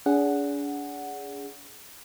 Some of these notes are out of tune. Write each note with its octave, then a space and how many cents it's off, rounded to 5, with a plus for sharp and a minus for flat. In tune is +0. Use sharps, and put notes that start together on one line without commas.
D4 -40 G#4 +0 F#5 +0